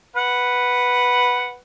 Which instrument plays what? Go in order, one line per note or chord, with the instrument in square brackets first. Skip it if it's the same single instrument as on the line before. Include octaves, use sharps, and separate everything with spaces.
[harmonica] B4 F#5